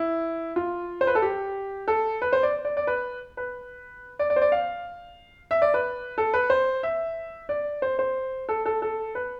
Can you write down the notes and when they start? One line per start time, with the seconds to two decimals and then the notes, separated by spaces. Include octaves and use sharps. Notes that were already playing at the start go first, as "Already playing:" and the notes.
Already playing: E4
0.56 F4
1.01 C5
1.07 B4
1.15 A4
1.22 G4
1.88 A4
2.22 B4
2.33 C5
2.43 D5
2.65 D5
2.77 D5
2.87 B4
3.37 B4
4.19 D5
4.30 D5
4.36 C5
4.42 D5
4.52 F5
5.51 E5
5.62 D5
5.74 B4
6.18 A4
6.34 B4
6.50 C5
6.83 E5
7.49 D5
7.82 C5
7.99 C5
8.49 A4
8.66 A4
8.82 A4
9.15 B4